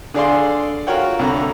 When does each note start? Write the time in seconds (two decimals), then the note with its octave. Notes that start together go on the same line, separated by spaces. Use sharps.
0.14 D3 D4 G#4 D5 F5 C6
0.87 F4 F#4 A#4 C#5 F#5 G5
1.19 C2 D3 A#5